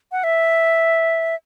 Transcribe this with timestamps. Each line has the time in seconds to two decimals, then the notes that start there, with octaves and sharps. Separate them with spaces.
0.12 F#5
0.24 E5